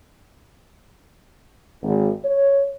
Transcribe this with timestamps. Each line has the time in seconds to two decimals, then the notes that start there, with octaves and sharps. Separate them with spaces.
1.83 G#1
2.24 C#5